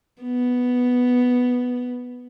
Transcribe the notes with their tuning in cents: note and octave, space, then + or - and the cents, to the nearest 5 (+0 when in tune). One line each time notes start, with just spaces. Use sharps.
B3 +0